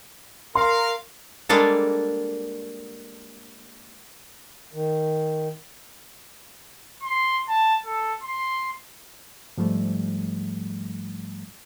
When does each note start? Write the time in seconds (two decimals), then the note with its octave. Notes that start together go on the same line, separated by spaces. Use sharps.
0.55 A#4 F5 C6
1.49 G3 G#3 A#3 D4 A4
4.73 D#3
7.03 C6
7.48 A5
7.86 A4
8.23 C6
9.58 G#2 F3 G3 A3